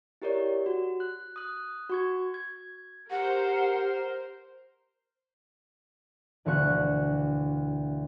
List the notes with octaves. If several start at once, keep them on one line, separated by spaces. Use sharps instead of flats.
E4 G4 A#4 C#5 D5
F#4
F#6
D#6 F#6
F#4 C#6 G#6
G#6
G4 A#4 C5 F#5
E1 D2 F5 C#6 F#6